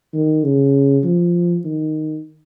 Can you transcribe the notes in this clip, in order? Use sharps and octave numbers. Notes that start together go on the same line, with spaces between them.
D#3
C#3
F3
D#3